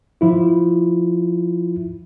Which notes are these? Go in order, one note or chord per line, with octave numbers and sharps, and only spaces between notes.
F3 E4 F4